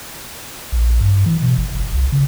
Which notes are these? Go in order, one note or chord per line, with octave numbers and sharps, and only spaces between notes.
A#1
G2
E3
B2
G1
G1
C2
C#3